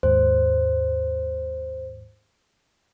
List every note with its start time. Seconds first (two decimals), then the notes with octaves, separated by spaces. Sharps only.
0.03 D#2 G#2 C5